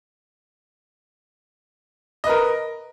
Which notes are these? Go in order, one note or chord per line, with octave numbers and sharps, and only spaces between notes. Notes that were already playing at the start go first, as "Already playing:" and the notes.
A#4 B4 D#5